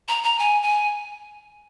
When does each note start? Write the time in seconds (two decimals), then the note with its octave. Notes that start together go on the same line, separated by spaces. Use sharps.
0.09 A#5
0.23 A#5
0.39 G#5
0.63 G#5